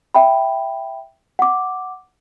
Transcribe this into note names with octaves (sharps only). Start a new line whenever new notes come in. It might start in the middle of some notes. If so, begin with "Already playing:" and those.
E5 G5 B5
F#5 D6